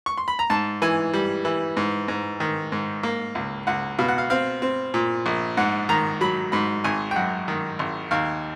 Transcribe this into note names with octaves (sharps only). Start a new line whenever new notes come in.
C#6
C6
B5
A#5
G#2 A5
E3 G#5
G3
E3
G#2
G#2
D#3
G#2
A#3
C#2
C#2 F#5
B2 F5
F#5
F5
C4 F5
C4
A#2
A#1
G#2 F#5
D#3 A#5
F#3 B5
G#2 B5
G#1 G#5
G5
F#2 F#5
D#3
G#1
D#2 F5